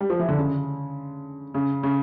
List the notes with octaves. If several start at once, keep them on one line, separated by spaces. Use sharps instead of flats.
G3
F3
E3
D3
C#3
C#3
C#3